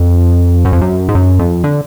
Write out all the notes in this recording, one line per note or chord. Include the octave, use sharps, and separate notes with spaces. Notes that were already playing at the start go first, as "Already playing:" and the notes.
Already playing: F2
F#2
F2
F#2
G#2
F#2
F2
D3